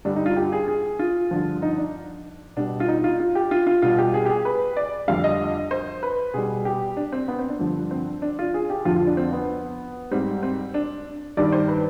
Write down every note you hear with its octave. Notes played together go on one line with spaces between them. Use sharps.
G2 D3 G3 D4
D#4
F4
G4
G#4
G#4
F4
G2 D3 F3
D#4
D4
B2 G3 D4
F4
D#4
F4
F4
G4
F4
F4
B2 G3 F4
G4
G#4
G4
G#4
B4
D5
F2 D3 G3 F5
D#5
C5
B4
B2 G3 G#4
G4
D4
C4
B3
C4
D4
G2 D3 F3
C4
D4
F4
G#4
G4
F2 D3 F3 F4
F4
D4
C4
B3
G#2 G3 C4
C4
D4
G2 D#3 G3 D5
C5
B4